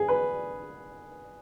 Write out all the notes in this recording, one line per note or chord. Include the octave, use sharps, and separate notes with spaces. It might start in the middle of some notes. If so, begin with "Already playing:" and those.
Already playing: G#4
B4